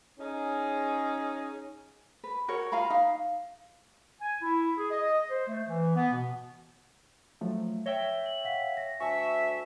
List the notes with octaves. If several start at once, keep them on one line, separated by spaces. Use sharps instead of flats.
C#4 D#4 G#4
B4
F#4 A#4 C#5
F4 F5 A#5 B5
D#4 F5
G#5
E4
G#4
D#5
C5
A3
E3
B3
B2
F3 F#3 A3
C#5 E5 G5 A#6 G7
F#7
F5 F#5 B6
A#6
D2 E5 G#5 A5 C#6